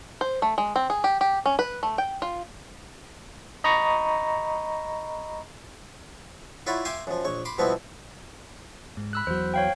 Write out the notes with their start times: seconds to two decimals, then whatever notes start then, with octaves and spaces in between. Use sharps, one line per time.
0.21 C5
0.42 A3
0.58 G#3
0.76 C4
0.90 G#4
1.04 G4
1.21 G4
1.46 C#4
1.59 B4
1.83 A3
1.98 G5
2.22 F4
3.64 D#5 A#5 B5 C#6 D#6
6.67 E4 F4 C#5 D5 F#5 B5
6.85 E5 F5 G5 G#5 C6 D6
7.07 F#2 F3
7.25 A#1 C#5
7.45 B5 C6 D6
7.58 B2 F3 G3 B3 C4 E4
8.97 G#2
9.13 B5 E6 F#6
9.27 E2 F#3 C5
9.54 C#5 F5 G5